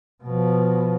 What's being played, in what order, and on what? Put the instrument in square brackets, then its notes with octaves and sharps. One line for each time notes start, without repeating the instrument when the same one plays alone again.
[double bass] B2 F3